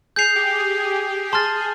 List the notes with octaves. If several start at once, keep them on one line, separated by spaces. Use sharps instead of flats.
G#4 G6 C7 F7
G4
G#4
G#4
G#4
G#4 A5 C6 F6 A6